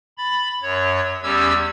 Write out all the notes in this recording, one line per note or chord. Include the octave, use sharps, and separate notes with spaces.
B5 A6
F#2 C#5
E2 G3 C#4 G4 E6 G#6